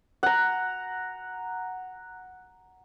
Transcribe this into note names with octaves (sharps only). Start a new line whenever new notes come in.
F#5 A#5